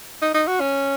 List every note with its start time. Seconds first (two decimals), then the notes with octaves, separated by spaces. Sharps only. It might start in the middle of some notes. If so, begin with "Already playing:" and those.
0.22 D#4
0.35 D#4
0.47 F#4
0.60 C#4